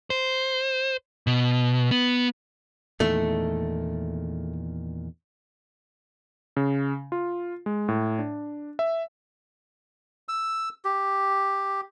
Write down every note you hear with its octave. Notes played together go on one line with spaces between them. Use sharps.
C5
B2
B3
E2 A#2 D#3 A3
C#3
F4
G#3
A2
D4
E5
E6
G4